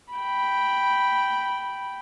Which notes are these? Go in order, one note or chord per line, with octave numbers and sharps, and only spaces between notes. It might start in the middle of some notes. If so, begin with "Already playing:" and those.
G5 B5